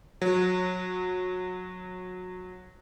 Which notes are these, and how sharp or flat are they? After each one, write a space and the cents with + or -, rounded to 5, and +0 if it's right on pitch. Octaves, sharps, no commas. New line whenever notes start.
F#3 -20